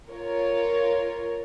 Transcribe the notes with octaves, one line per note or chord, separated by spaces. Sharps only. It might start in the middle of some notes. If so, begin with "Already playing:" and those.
F4 A#4 C#5